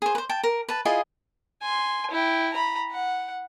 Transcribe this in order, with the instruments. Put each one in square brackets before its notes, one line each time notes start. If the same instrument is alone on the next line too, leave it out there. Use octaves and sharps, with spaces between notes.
[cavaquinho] G#4 C5
B4 C5
G5 A5
A#4
B4 A5
E4 F4 G#4 D#5
[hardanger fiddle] G#5 C6
E4 G5
A#5 B5
F#5